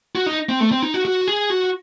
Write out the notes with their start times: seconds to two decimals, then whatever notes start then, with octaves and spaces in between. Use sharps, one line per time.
0.15 F#4
0.26 D#4
0.49 C4
0.61 A3
0.71 C4
0.82 D#4
0.94 F#4
1.05 F#4
1.28 G#4
1.50 F#4